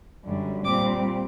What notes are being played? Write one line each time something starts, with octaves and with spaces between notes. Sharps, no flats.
F#2 D3 G3
A#2 G3 C4 D6